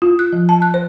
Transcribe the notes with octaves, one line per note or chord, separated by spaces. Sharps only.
F4
F#6
F3
A5
F#6
C5